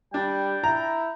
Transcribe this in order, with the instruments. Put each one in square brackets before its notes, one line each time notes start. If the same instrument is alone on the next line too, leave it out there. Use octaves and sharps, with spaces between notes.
[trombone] G3 [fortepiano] D4 [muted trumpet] G5
[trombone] E4 [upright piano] A#5